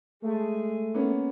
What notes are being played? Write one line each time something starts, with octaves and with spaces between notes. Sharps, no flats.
G#3 A3 G#4
A#3 B3 C#4